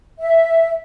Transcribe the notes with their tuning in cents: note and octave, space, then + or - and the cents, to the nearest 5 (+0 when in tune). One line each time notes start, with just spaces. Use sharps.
E5 +0